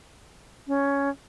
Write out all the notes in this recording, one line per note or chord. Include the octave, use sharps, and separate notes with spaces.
C#4